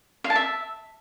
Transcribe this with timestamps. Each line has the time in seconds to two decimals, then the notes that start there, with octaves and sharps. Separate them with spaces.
0.24 F5
0.30 A5
0.36 E5